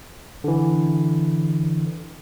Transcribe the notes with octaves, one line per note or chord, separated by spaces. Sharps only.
D3 E3